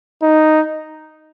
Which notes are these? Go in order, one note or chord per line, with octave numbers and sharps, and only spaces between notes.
D#4